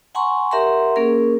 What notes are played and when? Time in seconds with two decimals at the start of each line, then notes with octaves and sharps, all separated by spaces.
0.15 F#5 G#5 A#5 C6 C#6
0.51 G4 A#4 E5 F#5 A#5 C6
0.96 A#3 C#4 G#4 A#4